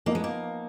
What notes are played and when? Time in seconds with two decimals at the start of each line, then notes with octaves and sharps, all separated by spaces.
0.06 F3 A#3 B3 D#4
0.15 G#3
0.24 A#3